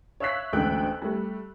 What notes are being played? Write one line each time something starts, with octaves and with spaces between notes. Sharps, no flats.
C#5 E5 F5 E6 F#6 B6
A1 D2 G#2 A3 G5 F#6
G3 A3